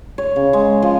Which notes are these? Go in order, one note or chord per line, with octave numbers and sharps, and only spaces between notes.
C#5
C#3
G#3
F3